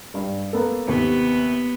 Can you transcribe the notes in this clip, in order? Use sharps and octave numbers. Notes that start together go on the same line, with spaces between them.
G2 G3
A#3 B3 A4
D#2 C3 B3